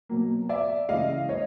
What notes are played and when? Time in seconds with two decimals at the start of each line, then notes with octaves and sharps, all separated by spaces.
0.09 B2 F#3 A#3
0.49 D5 E5
0.89 C#3 E3 G#3 D#5 F5
1.29 C#5 D#5